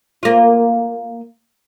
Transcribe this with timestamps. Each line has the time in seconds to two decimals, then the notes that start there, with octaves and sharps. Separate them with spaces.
0.23 A#3 F4